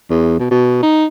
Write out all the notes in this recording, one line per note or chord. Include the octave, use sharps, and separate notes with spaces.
E2
B2
B2
D#4